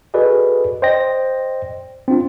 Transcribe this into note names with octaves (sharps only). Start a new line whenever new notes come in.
F#4 G#4 A4 B4 D5 D#5
C5 D5 D#5 G5 A#6
C4 D4 F4